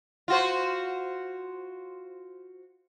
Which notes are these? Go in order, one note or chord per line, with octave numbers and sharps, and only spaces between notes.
F4 F#4 C5